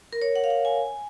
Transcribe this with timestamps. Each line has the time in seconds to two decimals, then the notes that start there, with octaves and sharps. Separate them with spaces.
0.13 A#4
0.22 C#5
0.36 F#5
0.44 F5
0.50 F#5
0.65 G#5